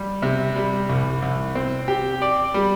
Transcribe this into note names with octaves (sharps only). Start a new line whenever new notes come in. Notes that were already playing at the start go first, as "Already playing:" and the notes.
Already playing: G3
C3
G3
C2
C2
C4
G4
D5
G3